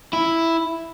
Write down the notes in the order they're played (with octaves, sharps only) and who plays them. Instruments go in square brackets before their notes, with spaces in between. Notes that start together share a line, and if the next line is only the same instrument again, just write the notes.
[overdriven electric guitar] E4